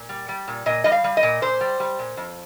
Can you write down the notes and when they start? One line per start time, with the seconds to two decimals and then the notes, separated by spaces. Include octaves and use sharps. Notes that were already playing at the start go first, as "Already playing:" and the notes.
Already playing: A#2
0.09 G3
0.29 G3
0.48 A#2
0.66 A#2 D#5
0.84 G3 D#5
0.92 F5
1.04 G3
1.17 D#5
1.23 A#2
1.42 A#2 C5
1.61 G3
1.80 G3
1.99 A#2
2.17 F2